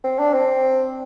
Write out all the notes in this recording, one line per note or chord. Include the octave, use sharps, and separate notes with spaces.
C4
D4
C4